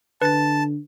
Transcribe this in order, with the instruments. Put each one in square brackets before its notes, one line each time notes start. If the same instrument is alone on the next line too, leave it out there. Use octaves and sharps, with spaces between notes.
[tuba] D3 [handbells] B4 A6 [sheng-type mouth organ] A5